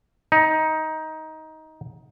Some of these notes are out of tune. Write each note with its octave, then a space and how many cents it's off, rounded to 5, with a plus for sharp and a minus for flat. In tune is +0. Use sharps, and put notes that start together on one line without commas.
D#4 +15